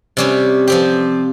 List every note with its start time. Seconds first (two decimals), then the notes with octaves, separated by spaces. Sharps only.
0.17 C3 G3 C#4 G4
0.68 F3 C4 G4